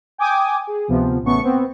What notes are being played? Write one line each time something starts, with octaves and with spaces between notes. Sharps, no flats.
G5 G#5 D6 D#6
G#4
D2 C3 F3 B3
A1 C#3 A3 B3 C#6
B3 C4